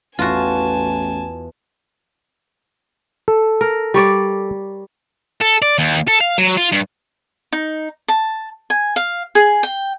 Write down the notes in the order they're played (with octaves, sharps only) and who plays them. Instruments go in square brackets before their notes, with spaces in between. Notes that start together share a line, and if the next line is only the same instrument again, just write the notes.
[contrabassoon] A1 [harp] E2 [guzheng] F4 F#4 [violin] G#5 A5
[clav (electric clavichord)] A4
[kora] A#4
G3 C#5 D5
[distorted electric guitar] A4
D5
D#2
A4
F5
F#3
F4
G2
[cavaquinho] D#4
A5
G#5
F5
G#4
G5